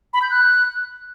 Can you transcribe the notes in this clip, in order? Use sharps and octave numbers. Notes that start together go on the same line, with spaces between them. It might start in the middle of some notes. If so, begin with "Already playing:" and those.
B5
G6
F#6